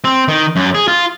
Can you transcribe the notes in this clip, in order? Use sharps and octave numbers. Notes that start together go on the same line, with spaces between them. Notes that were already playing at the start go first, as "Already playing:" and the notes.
C4
D#3
F#2
G#4
F4